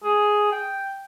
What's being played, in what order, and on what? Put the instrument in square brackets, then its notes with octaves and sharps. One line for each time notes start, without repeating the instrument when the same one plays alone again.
[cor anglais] G#4
G5